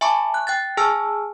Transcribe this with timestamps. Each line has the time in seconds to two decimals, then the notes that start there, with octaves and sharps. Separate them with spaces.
0.01 E5 G#5 A5 B5 C#6 D6
0.34 F#6
0.47 G5 F#6 A6
0.77 G#4 G#5 A5 E6 F6